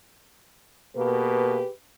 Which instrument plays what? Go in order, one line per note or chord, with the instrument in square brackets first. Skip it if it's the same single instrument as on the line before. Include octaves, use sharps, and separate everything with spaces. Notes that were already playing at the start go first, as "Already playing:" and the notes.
[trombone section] B2 A#3 [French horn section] G4 G#4 B4